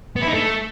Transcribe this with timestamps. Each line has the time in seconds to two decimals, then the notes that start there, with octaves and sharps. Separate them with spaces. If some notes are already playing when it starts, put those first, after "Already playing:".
0.16 B3
0.22 E4
0.28 D#4
0.34 A3